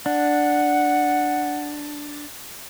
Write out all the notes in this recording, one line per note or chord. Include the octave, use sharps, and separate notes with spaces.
D4 F#5